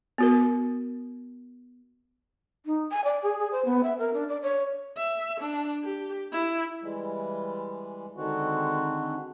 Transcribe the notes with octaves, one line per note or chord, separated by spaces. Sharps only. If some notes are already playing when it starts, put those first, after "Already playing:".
B3 F#4 A#4
D#4
G#5
D5
G#4
G#4
C5
B3
E5
A#4
D4
D5
C#5
E5
D4
G4
E4
E3 G3 G#3
D3 D#3 G#3 C4 F#4